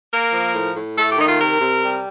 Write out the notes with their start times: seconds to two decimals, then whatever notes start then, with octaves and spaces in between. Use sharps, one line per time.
0.12 A#3 A#4
0.33 F3
0.55 A2
0.76 A2
0.96 A3 A4
1.11 G4
1.18 D#3 D#4
1.26 F4
1.40 C3 A#4
1.61 C3
1.83 G3